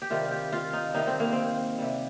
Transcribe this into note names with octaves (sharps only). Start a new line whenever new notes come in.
G4
C3 D#3 G3 F4
G4
F4
D#4
C3 D#3 G3 D#4
C4
A#3
C4
C3 G3